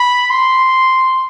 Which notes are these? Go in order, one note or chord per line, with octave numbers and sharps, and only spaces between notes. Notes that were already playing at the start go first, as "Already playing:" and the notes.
Already playing: B5
C6